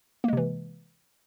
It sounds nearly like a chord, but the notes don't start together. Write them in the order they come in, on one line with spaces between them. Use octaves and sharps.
A#3 G#3 C3 E3